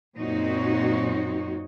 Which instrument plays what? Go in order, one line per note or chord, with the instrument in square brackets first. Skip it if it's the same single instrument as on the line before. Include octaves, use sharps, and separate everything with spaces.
[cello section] F#2 A#2 C4 D#4 F#4 C#5